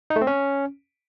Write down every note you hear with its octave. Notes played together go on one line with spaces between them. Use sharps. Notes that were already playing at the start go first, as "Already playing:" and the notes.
D#4
A3
C4
C#4